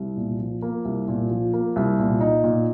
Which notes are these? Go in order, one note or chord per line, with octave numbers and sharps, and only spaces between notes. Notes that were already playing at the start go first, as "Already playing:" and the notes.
Already playing: C2
A#2
F3
A#3
C2
A#2
F3
A#3
C2
A#2
D#4
A#2